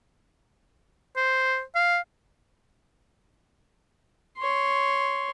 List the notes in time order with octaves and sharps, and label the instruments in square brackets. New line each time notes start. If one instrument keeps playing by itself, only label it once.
[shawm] C5
F5
[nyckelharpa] C#5 C6